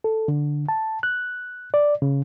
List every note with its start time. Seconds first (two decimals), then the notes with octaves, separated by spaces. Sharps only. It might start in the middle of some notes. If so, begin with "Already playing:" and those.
0.04 A4
0.28 D3
0.69 A5
1.03 F#6
1.74 D5
2.02 C#3